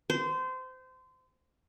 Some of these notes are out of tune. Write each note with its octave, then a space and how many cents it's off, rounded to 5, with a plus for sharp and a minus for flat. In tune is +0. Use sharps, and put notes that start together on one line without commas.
C5 -25